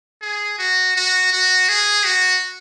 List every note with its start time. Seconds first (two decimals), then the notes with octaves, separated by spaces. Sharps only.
0.21 G#4
0.59 F#4
0.96 F#4
1.33 F#4
1.69 G#4
2.05 F#4